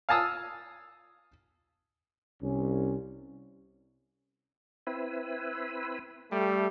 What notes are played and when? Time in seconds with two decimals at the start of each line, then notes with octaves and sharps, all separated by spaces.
0.09 F5 G#5 A5 D#6 E6
2.42 C2 C#4
4.87 C4 E4 B4
6.30 G3 A3